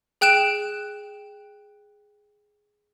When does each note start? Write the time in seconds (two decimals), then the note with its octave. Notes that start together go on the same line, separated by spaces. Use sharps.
0.21 G#4 G5 F#6 D7 E7